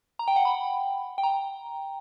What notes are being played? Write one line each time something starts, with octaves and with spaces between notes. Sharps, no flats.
A#5
G5
F#5
B5
G5
A#5